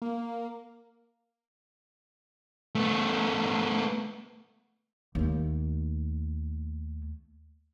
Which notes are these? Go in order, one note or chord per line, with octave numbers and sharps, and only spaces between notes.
A#3
A3 B3
D#2 A3